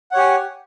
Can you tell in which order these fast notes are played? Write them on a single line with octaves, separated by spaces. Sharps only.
F#5 C#5 G4 G#5